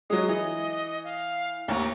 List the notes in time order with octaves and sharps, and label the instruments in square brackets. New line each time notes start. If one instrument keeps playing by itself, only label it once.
[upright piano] F#3 G#3 [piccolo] D#6
[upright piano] E3 [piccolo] D#5
[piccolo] F5
[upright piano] A1 D#2 [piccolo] A#5